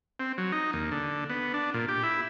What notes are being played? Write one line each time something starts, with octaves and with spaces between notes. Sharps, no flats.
C4
F#3
D#4
D#2
D3
B3
D4
A#2
G4
E4